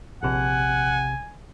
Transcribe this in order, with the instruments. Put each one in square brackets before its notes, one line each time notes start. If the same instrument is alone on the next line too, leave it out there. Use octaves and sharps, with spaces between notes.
[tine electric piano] A#1 C3 [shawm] F#5 [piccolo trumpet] G#5